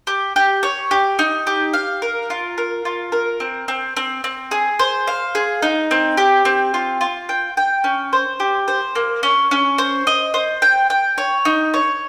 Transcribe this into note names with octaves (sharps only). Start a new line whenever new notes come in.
G4
G4
C#5
G4
D#4
G4
F5
A#4
F4
A#4
F4
A#4
C4
C4
C4
C4
G#4
C5
F5
G#4
D#4
C4
G4
C4
F4
F4
G5
G5
C#4
C5
G4
C5
A#3
C#4
C#4
C5
D#5
C5
G5
G5
C#5
D#4
C#5